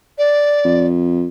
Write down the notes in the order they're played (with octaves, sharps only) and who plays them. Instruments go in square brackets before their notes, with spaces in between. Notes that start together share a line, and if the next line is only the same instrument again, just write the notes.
[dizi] D5
[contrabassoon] F2